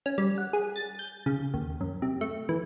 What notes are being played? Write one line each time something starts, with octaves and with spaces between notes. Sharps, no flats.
C#4
G3
F#5
G#4
A6
G6
C#3
D#2
F#2
C3
A3
E3